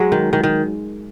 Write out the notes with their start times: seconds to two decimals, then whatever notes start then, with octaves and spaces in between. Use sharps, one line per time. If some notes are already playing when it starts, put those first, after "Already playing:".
Already playing: F#3 G#3
0.12 D#3
0.33 D#3
0.44 D#3